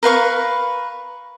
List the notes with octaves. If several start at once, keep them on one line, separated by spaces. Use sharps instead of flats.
A#4 B4 F5 C#6